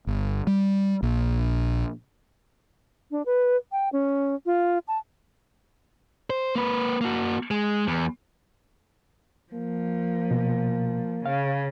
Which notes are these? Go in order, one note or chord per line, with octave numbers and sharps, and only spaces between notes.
G1
G3
A#1
D4
B4
G5
C#4
F4
A5
C5
A#3 B4
A#3 F#4
G#3
E2
F3 A#3
B2
C#3 F5